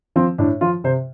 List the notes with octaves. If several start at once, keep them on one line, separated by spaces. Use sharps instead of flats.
F3 C4
A2 D4
F3 F4
C3 C5